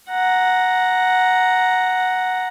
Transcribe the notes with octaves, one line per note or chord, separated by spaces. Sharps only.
F#5 A#5